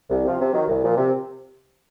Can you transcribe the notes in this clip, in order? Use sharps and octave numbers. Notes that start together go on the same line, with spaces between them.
C2
C3 F3 C4 F4
C3
D#3 F#3
C2
A#2 F3
C3